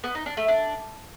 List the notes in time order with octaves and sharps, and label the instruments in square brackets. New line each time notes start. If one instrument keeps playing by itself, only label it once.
[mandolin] B3
D#4
D4
A3
D4